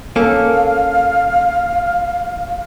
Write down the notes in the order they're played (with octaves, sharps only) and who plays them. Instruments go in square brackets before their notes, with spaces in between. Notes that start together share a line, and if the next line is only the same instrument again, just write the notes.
[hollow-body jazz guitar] A#3 C#4 A4 [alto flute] F5